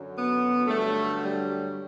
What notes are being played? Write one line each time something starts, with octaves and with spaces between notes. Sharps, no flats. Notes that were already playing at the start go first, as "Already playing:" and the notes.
Already playing: F#2 D3 F#3
B3
G2 D3 F#3 A3
G3